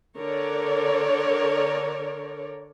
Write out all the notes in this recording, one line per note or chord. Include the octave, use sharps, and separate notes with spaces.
D3 A#4 C#5 D5